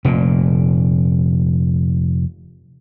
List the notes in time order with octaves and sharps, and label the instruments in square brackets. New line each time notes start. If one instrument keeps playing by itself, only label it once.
[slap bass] F1 A#2